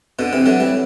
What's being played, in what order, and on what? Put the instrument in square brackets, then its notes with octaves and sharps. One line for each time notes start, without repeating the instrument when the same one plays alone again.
[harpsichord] B2 D3
C3 E3
D3 F#3
E3 G3